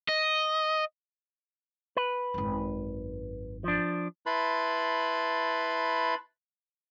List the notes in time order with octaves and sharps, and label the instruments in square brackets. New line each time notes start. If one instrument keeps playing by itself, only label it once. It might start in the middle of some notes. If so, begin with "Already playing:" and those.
[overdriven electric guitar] D#5
[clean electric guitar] B4
[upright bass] G#1 F#2
[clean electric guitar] F3 D4
[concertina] E4 B4 A5 B5 C6